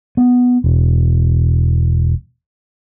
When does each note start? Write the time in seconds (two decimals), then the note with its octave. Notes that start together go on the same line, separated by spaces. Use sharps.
0.17 B3
0.64 E1